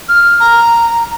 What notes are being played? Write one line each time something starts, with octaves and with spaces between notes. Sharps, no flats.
F6
A#5